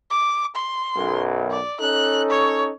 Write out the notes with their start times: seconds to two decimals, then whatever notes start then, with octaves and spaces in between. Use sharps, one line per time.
0.10 D6
0.55 C6
0.97 B1 F#2
1.50 D5
1.80 C#4 D#4 A4 F#6
2.30 C#5